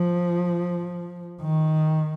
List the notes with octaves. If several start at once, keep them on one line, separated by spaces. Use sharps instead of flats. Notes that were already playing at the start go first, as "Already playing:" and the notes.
Already playing: F3
D#3